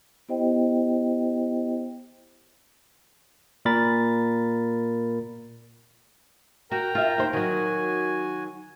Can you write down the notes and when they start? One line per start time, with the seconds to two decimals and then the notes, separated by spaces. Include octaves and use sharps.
0.29 B3 E4 G4 C5 D#5 G5
3.65 A#2 A#4 B5 A6
6.71 F#4 A#4 G5 A#5
6.95 F4 E5
7.18 D#2 C5
7.33 D#3 F#3 F#4 G#5